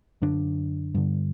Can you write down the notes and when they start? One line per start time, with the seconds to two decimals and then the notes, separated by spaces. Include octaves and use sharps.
0.22 F#2 D3 D4
0.95 G2 D3